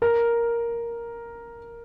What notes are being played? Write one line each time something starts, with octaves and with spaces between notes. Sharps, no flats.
A#4